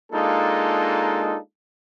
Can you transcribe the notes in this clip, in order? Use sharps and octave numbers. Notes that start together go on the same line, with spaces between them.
G#3 A#3 D4 D#4 F4 A4